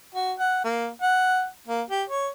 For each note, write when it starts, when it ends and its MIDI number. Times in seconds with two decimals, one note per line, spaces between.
0.15 0.32 66
0.39 0.61 78
0.64 0.88 58
1.02 1.46 78
1.68 1.82 58
1.90 2.03 67
2.09 2.29 73